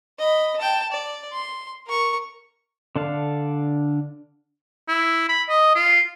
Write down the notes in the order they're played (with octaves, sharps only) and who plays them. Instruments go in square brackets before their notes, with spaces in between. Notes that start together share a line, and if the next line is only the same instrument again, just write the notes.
[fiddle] D#5 B5
G5 A5
D5
C6
A#4 C#6
[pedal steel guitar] D3 D4 A4 F5
[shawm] E4
B5
D#5
F4